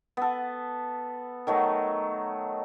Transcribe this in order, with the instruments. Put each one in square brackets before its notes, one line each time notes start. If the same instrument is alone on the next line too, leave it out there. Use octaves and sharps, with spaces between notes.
[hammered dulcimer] B3 A4
D#3 F#3 A3